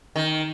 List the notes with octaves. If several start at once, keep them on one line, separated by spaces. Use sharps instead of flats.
D#3